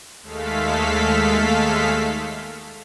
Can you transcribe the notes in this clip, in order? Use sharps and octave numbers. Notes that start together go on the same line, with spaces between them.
D#2 G#3 A3 A4 F5 B6